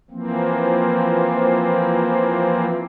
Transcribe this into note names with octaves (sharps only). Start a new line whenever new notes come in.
E3 F3 A#3 C4